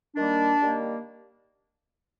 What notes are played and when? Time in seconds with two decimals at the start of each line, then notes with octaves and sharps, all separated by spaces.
0.16 D#3 G3 A#3 D4
0.60 D#3 G3 A#3